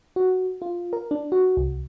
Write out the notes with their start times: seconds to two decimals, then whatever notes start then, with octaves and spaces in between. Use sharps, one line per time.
0.16 F#4
0.62 F4
0.93 A#4
1.11 D4
1.32 F#4
1.57 C2